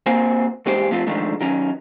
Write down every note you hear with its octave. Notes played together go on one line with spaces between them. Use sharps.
A#3 C4 F#4 C5 G#5
E2 G2 G#3 G4 C5
B1 F3 A3 C4 F4
D3 D#3 F3 G#3 A3
D#3 F#3 C#4